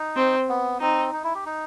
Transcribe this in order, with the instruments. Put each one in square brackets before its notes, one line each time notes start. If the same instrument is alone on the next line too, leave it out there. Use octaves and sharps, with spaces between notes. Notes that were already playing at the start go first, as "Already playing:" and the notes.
Already playing: [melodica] D#4
[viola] C4
[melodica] B3
[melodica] C4 [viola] D#4
[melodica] D#4
E4
G4
D#4